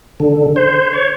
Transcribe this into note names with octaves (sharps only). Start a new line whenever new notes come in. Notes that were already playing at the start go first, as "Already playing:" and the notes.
D3
C5
C#5